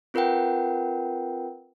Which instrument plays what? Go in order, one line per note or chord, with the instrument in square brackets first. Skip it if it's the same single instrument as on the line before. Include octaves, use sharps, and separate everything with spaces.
[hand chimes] C4 F4 A#4 B4 F#5 G5